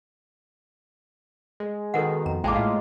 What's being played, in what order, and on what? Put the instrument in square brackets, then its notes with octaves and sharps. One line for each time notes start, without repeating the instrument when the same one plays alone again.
[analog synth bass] G#3
[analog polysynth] B2 D#3 [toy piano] A4 A#4 F#5
[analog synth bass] F2 [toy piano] A#5
[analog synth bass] A1 [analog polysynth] G#3 A#3 F4 [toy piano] G5 A5 D6
[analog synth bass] A2 [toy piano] F5